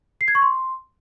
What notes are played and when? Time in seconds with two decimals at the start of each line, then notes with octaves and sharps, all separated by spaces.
0.21 C7
0.28 G#6
0.35 C#6
0.42 C6